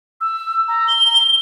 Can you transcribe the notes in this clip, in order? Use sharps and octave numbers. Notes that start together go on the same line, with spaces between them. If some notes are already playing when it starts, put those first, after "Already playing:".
E6
A#5
G7